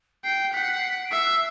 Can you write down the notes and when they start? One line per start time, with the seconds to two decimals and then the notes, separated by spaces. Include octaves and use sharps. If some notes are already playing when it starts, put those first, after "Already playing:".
0.24 G5 C7
0.53 F#5 B6
0.62 C7
0.70 B6
0.78 C7
0.86 B6
1.05 D7
1.12 E5 C7